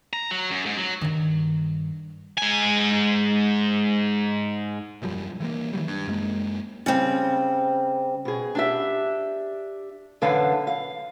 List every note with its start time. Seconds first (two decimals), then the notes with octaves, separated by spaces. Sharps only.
0.13 A#5
0.31 F#3
0.51 F#2
0.66 G#2
0.77 F#3
1.01 G2 D#3
2.38 G#2 G#5
5.02 E1 F#2 F3 G3
5.40 E3 G3 A#3
5.73 D#3 E3 F#3 G3
5.88 G2
6.07 F#2 G#3 A#3
6.86 C#3 G3 C4
8.25 B2 G#4
8.55 D4 G4 E5
10.22 F#2 D3 E3 D4 B4 F5
10.67 F5